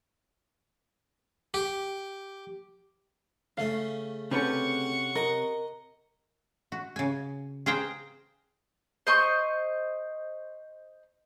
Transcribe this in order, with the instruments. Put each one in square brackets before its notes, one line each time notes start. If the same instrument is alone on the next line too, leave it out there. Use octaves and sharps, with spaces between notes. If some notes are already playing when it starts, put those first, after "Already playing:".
[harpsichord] G4
[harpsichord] C#3 A3 [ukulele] F5
[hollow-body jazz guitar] C3 C#4 B4 [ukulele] G4 A4 [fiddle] F#5 C#6
[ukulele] A#4 [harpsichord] D#5
[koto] F#4
C#3 G#5
G#4 B4 C5 F5 G5 A#5
[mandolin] C5 D#5 C#6